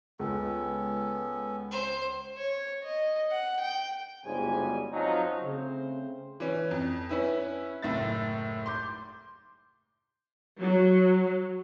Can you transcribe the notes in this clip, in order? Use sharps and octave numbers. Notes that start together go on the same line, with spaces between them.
C#2 B3 C#4 A4
C5
C#5
D#5
F#5
G5
G1 D2 G#2 C#3 G3 G#5
F#2 F3 F#3 C4 D#4
C#3 A3 C4 C5
E3 C#4
F2
C#4 E4 B4
F#1 A2 E5 A6
C6 D6 G6
F#3